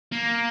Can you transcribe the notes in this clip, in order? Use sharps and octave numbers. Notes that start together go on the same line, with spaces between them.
A#3